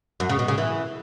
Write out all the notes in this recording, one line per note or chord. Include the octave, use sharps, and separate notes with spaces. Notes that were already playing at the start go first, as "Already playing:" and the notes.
F#2
C#3
B2
C#3
E3